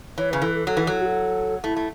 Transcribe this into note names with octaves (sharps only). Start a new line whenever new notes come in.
E3 C#5
C#3 B4
E3 A4
A4
F#3 A4
E3
B4
F#3 A4
F#4
A4
A3 E4
A3